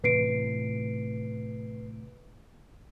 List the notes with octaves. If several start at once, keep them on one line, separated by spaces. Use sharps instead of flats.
A2 C3 E3 B4 C7 D7